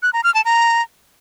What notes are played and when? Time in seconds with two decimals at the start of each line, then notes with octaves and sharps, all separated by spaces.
0.03 F#6
0.13 A#5
0.24 F6
0.34 A5
0.45 A#5